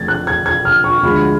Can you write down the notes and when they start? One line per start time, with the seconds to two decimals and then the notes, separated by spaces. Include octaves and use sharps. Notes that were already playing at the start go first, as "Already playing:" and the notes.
Already playing: F2 D3 A3 G#6 A6
0.08 F#6
0.27 G#6
0.46 G#6
0.65 F6
0.84 C#6
1.03 D2 D3 F3 G#3 B5